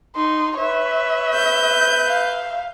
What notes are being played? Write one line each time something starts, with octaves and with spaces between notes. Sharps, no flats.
D#4 C6
B4 C#5 E5
G6
F5